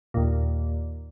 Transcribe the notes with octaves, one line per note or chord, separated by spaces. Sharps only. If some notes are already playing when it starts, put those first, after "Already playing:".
D#2 A#2